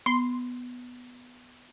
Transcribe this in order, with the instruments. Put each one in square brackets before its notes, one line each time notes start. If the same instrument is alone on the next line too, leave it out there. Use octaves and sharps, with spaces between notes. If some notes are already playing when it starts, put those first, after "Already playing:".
[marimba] B3 [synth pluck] C6